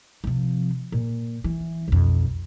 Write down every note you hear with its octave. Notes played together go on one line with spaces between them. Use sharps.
C3 F3
A#2
E3
B1 F2